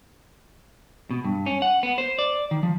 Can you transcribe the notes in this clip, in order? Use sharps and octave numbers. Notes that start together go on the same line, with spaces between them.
B2
G2
C#4
F#5
B3
C5
D5
D#3
F3